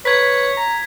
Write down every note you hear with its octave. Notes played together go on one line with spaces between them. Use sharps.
B4 C#5 G#6 B6
A#5